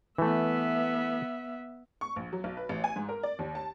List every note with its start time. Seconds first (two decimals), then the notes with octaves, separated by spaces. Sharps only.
0.18 E3 A3 B3 E5
2.01 C#6
2.16 A#1
2.33 F#3
2.44 B1
2.57 B4
2.69 A1
2.84 G#5
2.96 G#2
3.09 A#4
3.23 D5
3.39 D#2
3.55 A5